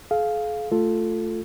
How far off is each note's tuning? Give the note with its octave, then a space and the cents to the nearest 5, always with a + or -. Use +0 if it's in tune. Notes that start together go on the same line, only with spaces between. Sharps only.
G#4 +45 F5 +0
A3 +5 F4 +0 A4 +0